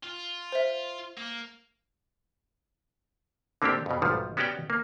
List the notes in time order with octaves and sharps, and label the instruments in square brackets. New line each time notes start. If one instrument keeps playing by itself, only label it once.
[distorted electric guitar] F4
[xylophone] C5 E5
[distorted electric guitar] A#3
[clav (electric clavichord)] D3 A#3 C4 D4 G4
F2 B2
B1 G#2 D#3 F3 G3 A3
B3 C#4 F#4 G4 D5 G5
A#3